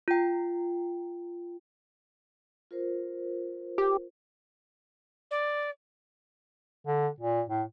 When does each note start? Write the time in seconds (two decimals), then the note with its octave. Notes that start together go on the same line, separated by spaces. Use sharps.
0.08 F4 G5
2.71 F4 A#4 C5
3.78 G4
5.31 D5
6.87 D3
7.20 A#2
7.49 A2